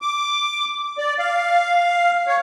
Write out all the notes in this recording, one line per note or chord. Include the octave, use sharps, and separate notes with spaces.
D6
D5
F5
C#5